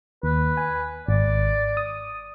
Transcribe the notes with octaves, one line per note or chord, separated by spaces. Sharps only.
D#2 B4
G#5
G#1 D5
D#6